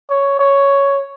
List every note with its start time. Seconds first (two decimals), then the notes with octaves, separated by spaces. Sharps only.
0.10 C#5
0.39 C#5